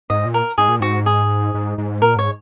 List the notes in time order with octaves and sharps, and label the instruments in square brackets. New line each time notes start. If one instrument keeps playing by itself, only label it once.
[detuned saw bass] G#2 [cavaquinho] D#5
[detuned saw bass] A#2
[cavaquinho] A#4
[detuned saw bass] G#2 [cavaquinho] G#4
[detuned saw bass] A#2
[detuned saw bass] G#2 [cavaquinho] F#4
[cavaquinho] G#4
[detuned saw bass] G#2
G#2
[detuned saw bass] A#2 [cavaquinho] A#4
[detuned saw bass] G#2 [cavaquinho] C#5